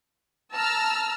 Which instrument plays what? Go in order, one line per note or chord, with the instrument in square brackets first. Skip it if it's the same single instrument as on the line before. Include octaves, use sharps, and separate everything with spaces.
[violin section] A5 A#5 E6 F6